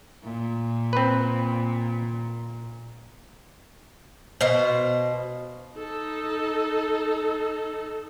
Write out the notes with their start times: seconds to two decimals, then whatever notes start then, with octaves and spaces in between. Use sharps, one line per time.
0.24 A#2
0.93 C4 B4
4.41 B2 C5 F5
5.77 D#4 A4